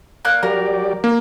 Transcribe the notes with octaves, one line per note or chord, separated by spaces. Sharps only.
A#3 D5 F#6
F#3 G4 A#4 D5
A#3